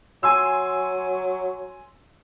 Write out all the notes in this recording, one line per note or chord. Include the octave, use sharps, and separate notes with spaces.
F#3 G#5 C6 E6